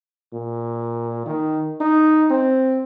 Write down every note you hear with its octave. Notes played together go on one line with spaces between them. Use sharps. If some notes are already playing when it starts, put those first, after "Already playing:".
A#2
D#3
D#4
C4